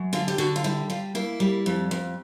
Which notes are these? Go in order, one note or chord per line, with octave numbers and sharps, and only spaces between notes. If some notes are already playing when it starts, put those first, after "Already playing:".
Already playing: F#2
D3 F4
G4
D3 F#4
F4
G3 E4
G3 F4
A#3 E4
G3
F2
F2